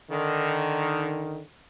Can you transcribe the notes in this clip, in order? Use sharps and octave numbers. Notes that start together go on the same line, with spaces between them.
D3 D#3